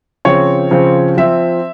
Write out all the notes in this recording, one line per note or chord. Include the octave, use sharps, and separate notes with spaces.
C#3 F3 C4 C#5
C#3 F3 C4
F3 C4 E5